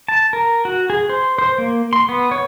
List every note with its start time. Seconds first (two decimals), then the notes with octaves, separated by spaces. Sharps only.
0.08 A5
0.33 A#4
0.65 F#4
0.90 G#4
1.09 C5
1.38 C5
1.58 A#3
1.93 C6
2.09 B3
2.31 C#5